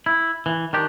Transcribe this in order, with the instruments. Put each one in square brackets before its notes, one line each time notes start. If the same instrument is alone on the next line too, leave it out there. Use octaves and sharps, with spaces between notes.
[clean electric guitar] E4
E3
D#3 D4 G4